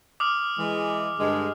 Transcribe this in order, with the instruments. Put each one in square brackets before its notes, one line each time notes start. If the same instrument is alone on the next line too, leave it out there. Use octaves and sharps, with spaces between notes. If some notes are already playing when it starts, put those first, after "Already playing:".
[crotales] D6 D#6 F6
[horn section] E3 G#3
G2 D3 G#3